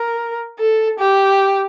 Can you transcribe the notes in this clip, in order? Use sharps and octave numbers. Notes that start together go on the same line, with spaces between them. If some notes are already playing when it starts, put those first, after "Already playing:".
Already playing: A#4
A4
G4